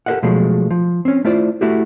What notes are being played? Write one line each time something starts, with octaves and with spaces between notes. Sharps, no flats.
G4 A4 A#4 D#5 F5 F#5
B2 F3 F#3 G#3 A3
F3
C4 C#4
A3 E4 F4 C5 D5
A3 E4 F#4 G4